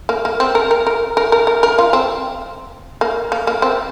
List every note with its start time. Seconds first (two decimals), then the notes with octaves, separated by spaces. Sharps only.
0.09 A#3
0.25 A#3
0.40 C4
0.55 A#4
0.71 A#4
0.87 A#4
1.17 A#4
1.32 A#4
1.47 A#4
1.63 A#4
1.78 F4
1.93 C4
3.01 A#3
3.32 A#3
3.47 A#3
3.62 C4